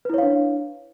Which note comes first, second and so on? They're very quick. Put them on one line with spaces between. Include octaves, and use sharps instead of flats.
B4 E4 C#5 F5 D4